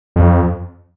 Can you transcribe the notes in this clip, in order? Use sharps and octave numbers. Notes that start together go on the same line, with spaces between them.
F2